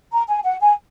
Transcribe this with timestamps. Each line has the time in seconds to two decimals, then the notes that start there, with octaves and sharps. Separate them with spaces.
0.13 A#5
0.29 G#5
0.45 F#5
0.61 G#5